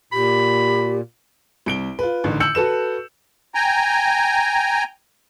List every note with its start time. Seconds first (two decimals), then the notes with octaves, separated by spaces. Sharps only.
0.13 A#2 G4 B5
1.66 C2 D7 G7
1.99 F4 B4
2.24 A1 D3 D#3
2.40 E6 G6 C#7 F#7
2.55 F#4 A4 B4 E7
3.55 G5 G#5 A#5